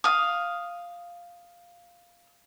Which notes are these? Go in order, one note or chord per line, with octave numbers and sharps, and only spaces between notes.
F5 D#6